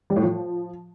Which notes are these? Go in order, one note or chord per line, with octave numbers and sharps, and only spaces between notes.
G3
A2
F3